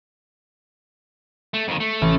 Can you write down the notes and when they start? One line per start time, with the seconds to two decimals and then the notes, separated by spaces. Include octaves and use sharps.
1.54 A3
1.68 F2 D#3
1.80 A3
2.01 A1